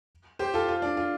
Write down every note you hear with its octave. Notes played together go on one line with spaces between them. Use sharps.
G4 C5
F4 A4
F4
D4
F4